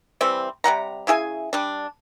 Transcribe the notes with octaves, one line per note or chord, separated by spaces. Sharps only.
E3 G3 C4
C3 G3 F#5 A#5
C#3 E4 G#4 G#5
G3 D4